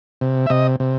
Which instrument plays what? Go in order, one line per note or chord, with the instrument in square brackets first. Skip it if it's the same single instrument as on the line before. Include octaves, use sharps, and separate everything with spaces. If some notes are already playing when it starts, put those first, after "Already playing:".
[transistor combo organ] C3
E5
C3 D#5
C3